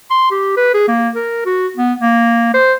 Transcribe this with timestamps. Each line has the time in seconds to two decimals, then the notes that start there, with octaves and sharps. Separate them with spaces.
0.10 C6
0.31 G4
0.57 B4
0.74 G#4
0.88 A#3
1.15 A#4
1.46 F#4
1.77 B3
2.00 A#3
2.54 C5